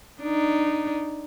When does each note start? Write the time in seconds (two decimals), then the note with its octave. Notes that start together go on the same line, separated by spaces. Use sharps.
0.21 D4 D#4